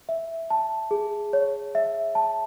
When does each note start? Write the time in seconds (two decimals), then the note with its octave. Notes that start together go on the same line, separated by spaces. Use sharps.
0.09 E5
0.50 A5
0.91 G#4
1.33 C#5
1.75 E5
2.15 A5